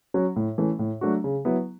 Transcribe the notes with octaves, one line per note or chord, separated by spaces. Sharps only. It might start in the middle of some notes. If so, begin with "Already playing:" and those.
F#3 C#4 F#4
A2
E3 A3 C#4
A2
F#3 A3 D4 F#4
C#3
F#3 B3 E4